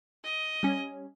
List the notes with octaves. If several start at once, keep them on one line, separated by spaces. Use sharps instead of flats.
D#5
G3 C#4